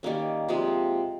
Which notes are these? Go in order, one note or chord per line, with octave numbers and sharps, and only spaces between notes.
D#3 G3 A#3 C#4
C3 F3 G#3